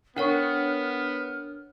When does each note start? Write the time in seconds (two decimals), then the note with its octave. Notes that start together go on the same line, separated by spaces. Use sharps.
0.16 B3 D4 A#4 C#5 F#5 C#6 F6